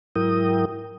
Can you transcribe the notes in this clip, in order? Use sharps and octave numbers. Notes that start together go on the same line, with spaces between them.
G#2 F#3 E4 A#4 G5 D#6